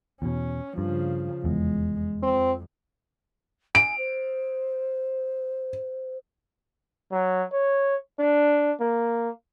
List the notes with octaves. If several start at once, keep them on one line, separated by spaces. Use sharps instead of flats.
E2 B2 C#4
G2 C#3 F3
F1 E2 G#3
F2 C4
G#5 D7
C5
F#3
C#5
D4
A#3